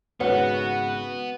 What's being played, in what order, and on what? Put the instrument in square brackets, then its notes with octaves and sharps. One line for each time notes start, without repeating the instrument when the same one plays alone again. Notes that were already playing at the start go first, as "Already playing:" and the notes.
[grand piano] G#1 C#3 [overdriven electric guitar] B3 [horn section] F#4 [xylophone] B4 C#5 F#5